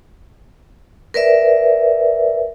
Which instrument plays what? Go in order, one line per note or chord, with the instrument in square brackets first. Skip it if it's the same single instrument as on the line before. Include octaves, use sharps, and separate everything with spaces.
[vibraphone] A#4 B4 D5 E5